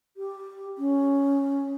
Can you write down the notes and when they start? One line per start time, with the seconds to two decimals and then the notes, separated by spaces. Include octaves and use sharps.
0.17 G4
0.78 C#4